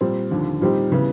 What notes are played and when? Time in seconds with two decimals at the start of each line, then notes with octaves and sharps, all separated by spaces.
0.01 A#2 G3 C4
0.31 D#2 D3 F3
0.61 A#2 G3 C4 D#4 G4
0.92 C#3 E3 G3 B3